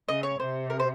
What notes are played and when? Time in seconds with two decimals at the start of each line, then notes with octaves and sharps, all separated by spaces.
0.08 C#3 D#5
0.23 C#5
0.39 C3 C5
0.70 A#4
0.80 C5